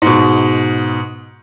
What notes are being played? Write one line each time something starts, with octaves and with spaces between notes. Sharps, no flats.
G#2 B2